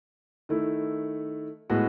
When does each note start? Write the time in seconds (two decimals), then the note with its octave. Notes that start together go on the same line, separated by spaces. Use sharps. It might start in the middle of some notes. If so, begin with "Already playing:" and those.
0.49 D#3 A3 E4
1.70 A2 G#3 B3 F#4